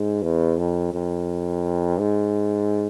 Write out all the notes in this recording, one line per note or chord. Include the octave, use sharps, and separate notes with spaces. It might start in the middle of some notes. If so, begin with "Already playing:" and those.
Already playing: G#2
E2
F2
F2
G#2